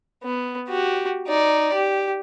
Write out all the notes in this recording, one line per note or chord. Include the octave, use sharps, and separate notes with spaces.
B3
F#4 G4
D#4 D5
G4